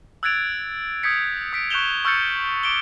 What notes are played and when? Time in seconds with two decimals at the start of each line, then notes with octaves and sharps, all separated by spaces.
0.23 E6 F#6 G#6 A6 D7 F7
1.03 D#6 G6 G#6 B6 C#7
1.53 D#6 B6 D7
1.70 C#6 F#6 G6 E7 F7 G7
2.05 C#6 E6 F6 G6 A6 C#7
2.63 D6 D7 G7